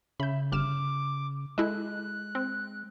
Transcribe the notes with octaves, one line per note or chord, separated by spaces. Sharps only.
C#3 E5 B5 G6
G1 D6 F6 E7
G#3 E4 A4 D#5 F#6
C4